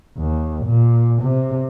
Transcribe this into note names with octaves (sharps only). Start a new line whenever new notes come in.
D#2
A#2
C3